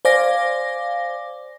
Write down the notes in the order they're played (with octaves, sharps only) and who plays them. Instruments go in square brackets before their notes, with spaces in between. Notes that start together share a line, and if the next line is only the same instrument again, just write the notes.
[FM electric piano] C5 D5 F5 G#5 D6 A#6